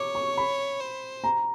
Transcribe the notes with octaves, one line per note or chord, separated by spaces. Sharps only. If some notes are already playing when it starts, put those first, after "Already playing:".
Already playing: C#5 D6
C#6
B5
C5
A#5